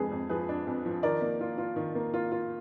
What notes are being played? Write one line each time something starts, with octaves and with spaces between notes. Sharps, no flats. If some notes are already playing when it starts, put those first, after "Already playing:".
Already playing: F2 G#3 D4 G#4 B4
F2
F3 G#4 B4
D4
F2
F3
D#3 A#4 D5
A#3
F4
F4
D#3
A#3
F4
F4